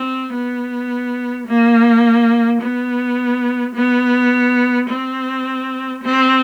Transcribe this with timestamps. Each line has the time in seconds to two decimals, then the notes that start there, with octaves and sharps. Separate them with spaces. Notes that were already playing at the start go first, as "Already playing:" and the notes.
Already playing: C4
0.33 B3
1.47 A#3
2.62 B3
3.75 B3
4.89 C4
6.04 C4